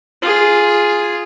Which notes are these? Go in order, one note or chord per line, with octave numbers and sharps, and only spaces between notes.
F4 G#4